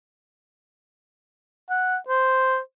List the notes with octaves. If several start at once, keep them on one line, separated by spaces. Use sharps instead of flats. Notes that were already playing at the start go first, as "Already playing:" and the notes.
F#5
C5